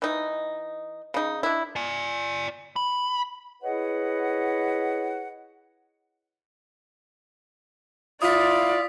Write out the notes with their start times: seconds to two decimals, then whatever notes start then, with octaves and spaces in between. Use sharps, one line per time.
0.02 E3 D#4
1.14 C#3 D#4
1.43 D4 E4
1.76 D5 G#5
2.76 B5
3.62 E4 G#4 B4 C#5 D#5 F#5
8.22 E4 F4 D5 D#6 B6